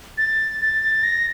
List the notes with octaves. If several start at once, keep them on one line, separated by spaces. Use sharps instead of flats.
A6
A6
A#6